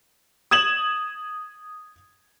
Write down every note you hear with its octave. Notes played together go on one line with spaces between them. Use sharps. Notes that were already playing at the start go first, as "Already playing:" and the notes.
D#6 G#6 E7 F#7